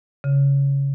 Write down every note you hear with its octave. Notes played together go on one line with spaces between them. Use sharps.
C#3